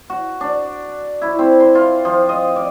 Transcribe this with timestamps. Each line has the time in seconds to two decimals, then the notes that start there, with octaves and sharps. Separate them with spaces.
0.10 F#4
0.41 D4
1.22 E4
1.39 C4
1.60 C6
1.75 F4
2.05 F3
2.29 D#5
2.56 D5